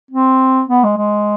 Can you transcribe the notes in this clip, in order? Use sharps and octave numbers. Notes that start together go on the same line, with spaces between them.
C4
B3
G#3
G#3